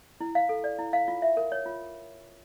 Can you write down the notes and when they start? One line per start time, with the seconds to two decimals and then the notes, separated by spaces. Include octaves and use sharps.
0.21 E4
0.35 F5
0.49 A4
0.64 D5
0.79 E4
0.93 F5
1.08 F4
1.22 E5
1.37 A#4
1.52 C#5
1.66 F4